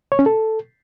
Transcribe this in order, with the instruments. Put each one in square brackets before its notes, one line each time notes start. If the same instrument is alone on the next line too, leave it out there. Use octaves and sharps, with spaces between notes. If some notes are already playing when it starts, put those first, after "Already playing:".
[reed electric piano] C#5
C#4
A4